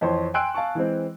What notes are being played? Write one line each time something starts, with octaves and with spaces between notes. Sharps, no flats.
F2 E3 C5 C#5 C6
G5 G#5 C6 E6 F#6 D7
F5 G#5 A5 C#6
E3 G#3 C4